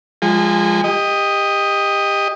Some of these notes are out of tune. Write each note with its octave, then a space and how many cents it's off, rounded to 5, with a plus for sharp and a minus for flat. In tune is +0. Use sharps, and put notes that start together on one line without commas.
F3 +0 G#3 -20 G#5 -35
G4 +20 D#5 +0